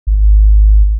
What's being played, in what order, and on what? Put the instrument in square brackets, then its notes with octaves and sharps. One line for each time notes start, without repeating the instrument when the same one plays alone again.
[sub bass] G#1